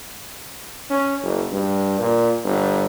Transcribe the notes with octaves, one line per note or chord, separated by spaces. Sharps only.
C#4
F#1
G2
A#2
G1